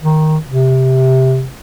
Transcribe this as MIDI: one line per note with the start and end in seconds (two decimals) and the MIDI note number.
0.02 0.37 51
0.48 1.46 48